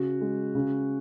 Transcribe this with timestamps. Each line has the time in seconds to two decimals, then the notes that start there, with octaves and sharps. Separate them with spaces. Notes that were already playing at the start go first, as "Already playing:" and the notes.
Already playing: C#3 F#4
0.21 G#3
0.55 C#3